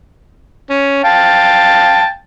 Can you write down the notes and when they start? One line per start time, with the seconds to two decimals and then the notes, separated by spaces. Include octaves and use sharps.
0.70 C#4
1.04 F5 G5 A5